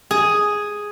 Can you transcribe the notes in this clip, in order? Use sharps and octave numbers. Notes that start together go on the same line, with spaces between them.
G#4